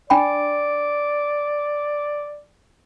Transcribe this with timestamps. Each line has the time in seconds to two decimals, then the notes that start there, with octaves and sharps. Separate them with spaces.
0.10 D4 D5 G5 B5